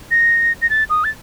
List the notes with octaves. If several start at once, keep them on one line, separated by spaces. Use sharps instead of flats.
A#6
A#6
A6
D#6
A6